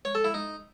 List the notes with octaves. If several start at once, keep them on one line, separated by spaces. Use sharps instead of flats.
C#5
A4
E4
D#4